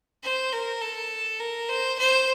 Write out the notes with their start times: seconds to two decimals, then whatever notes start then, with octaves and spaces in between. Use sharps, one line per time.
0.23 C5
0.53 A#4
0.81 A4
1.40 A#4
1.69 C5
1.98 C5